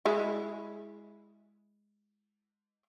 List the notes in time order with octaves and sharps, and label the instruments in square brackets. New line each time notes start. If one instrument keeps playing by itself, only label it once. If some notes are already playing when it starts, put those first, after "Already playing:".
[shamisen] G#3 E4